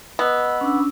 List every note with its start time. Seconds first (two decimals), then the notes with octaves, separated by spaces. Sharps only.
0.19 B3 D#5 E6
0.61 C#4 D4 E6